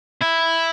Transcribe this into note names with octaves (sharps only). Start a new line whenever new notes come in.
E4